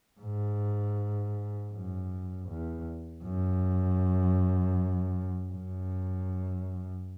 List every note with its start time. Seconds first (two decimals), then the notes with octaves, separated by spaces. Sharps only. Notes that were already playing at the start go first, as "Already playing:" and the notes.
0.20 G#2
1.72 F#2
2.49 E2
3.24 F#2
5.52 F#2